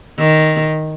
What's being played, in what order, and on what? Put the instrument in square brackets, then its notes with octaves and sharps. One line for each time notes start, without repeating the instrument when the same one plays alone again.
[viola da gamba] D#3